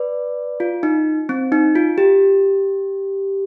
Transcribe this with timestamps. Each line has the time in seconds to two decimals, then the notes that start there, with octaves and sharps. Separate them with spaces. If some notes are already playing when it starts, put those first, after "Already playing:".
Already playing: B4 D5
0.60 F4
0.83 D#4
1.29 C4
1.52 D#4
1.76 F4
1.98 G4